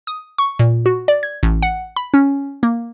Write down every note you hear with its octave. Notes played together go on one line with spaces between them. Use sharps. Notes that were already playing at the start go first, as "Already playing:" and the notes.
D#6
C#6
A#2
F#4
D5
G#6
A1
F#5
B5
C#4
A#3